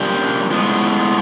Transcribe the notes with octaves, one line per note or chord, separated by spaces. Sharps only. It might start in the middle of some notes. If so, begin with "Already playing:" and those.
Already playing: F3 A#3 D4 G4
A2 F3 G#3 B3